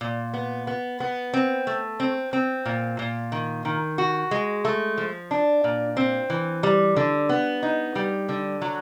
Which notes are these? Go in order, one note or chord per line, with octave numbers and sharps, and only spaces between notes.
A#2
B3
B3
B3
C4
A3
C4
C4
A#2
A#2
D#3
D#3
F#4
G#3
A3
F3
D4
A#2
C4
E3
G3
D3
B3
D#4
G3
D3
F#3